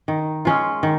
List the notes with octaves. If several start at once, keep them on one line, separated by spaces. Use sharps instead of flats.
D#3
G#3 C#4 F4
D#3